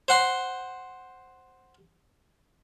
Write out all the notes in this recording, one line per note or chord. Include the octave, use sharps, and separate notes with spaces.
C5 F#5 C6